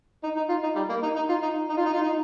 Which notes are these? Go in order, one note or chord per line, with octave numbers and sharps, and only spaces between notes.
D#4
D#4
F4
D#4
G3
A#3
D#4
D#4
F4
D#4
D#4
F4
D#4
F4
D#4